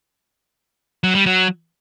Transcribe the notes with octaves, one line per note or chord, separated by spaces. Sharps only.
F#3
G3
F#3